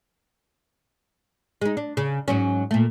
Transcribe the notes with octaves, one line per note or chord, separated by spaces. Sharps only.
G#3 D#4
D4
C#3
G#2 F#3 C#4
A#2 A3